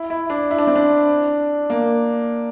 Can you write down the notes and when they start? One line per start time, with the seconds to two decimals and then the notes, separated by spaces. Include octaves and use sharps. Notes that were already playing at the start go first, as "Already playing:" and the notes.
Already playing: E4
0.10 E4
0.30 D4
0.51 E4
0.58 D4
0.67 C4
0.76 D4
1.70 A#3